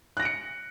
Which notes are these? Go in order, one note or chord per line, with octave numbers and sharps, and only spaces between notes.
F#6 A#6 C#7 D7